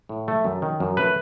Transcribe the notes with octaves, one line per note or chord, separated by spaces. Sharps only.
A2
A3
F#2
D#3
F#2
A3 B4